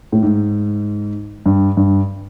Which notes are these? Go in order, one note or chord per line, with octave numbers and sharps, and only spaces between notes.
A2
G#2
G2
G2